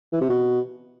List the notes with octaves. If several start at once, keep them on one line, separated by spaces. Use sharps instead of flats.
E3
C3
B2